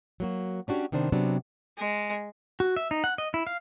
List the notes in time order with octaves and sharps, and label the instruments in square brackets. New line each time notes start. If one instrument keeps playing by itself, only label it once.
[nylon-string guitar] F#3 A#3 F#4
C#4 D4 F#4 G4 C#5
C3 D#3 B3 D4 C5
C3 F#3 B3 C4 D4
[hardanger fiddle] G#3
[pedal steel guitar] F#4
E5
D#4
F#5
D#5
E4
F5